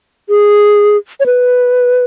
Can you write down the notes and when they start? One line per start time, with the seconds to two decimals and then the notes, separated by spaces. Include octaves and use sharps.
0.29 G#4
1.20 C#5
1.26 B4